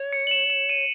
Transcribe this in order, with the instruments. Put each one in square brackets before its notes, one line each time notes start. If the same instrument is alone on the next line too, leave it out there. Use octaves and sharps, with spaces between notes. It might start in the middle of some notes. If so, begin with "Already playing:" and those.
Already playing: [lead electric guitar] C#5
[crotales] C#7
F#7
E7
E7
D#7